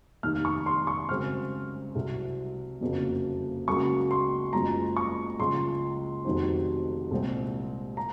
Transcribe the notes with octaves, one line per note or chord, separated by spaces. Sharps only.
F1 D#2 D#3 F6
C#6
C6
C#6
F#2 C#3 G#3 C4 F6
C2 C3 F#3
F#1 F2 C#3 F#3 A#3
C#2 C#3 F#3 A#3 C#6
C6
F#1 F#2 F3 G#3 A#5
C#6
C#2 C#3 F3 C6
F1 F2 D#3 F#3 C4
C2 A#2 G#3 C4
A#5